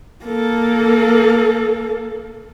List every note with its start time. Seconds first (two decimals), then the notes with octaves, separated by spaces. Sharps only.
0.24 A#3 A4